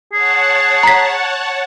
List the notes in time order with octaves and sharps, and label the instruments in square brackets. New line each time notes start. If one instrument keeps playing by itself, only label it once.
[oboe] G#4 [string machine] C#5 F#5 A5
[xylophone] A#5 B6